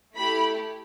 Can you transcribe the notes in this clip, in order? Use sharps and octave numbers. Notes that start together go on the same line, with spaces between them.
A3 E4 G4 B5